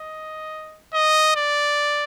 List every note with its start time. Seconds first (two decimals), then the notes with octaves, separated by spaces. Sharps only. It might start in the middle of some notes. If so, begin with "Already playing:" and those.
Already playing: D#5
0.94 D#5
1.36 D5